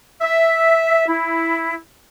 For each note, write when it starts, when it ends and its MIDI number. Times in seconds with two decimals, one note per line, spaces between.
0.21 1.07 76
1.08 1.75 64